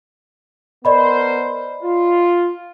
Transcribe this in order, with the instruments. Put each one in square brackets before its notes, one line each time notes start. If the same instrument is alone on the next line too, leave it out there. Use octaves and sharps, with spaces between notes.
[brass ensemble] B3 A#4 C5 [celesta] D5 D#5 B5
[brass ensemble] F4